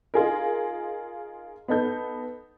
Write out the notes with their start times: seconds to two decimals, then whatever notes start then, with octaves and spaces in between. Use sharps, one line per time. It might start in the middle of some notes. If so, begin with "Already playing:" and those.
0.14 D#4 F4 G#4 A#4
1.68 B3 D#4 A4 G6